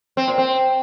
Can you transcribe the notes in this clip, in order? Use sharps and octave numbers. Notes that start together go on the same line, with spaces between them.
C4
A#2
C4